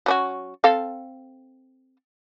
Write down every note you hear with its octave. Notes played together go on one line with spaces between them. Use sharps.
F#3 C#4 F#4
C4 A4 F5